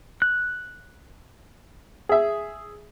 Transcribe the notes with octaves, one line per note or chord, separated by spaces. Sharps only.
F#6
G#4 E5